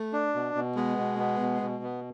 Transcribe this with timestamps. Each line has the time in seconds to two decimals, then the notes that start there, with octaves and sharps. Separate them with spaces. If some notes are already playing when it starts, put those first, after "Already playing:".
Already playing: A3
0.13 D4
0.35 B2
0.55 B2
0.76 G#3 B3
0.98 B2
1.19 B3
1.40 B2
1.62 B2
1.84 B3